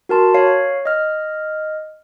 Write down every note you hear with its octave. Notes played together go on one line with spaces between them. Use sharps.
F#4 A#4 A5 C6
C#5 F5 C7
D#5 F6